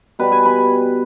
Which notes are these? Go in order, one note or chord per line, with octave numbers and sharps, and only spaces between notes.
B2 G3 B4
G#5
B5